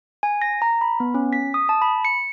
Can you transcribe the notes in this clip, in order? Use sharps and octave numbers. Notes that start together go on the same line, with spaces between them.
G#5
A#6
A#5
B5
B3
C#4
B6
D#6
A5
B5
C#7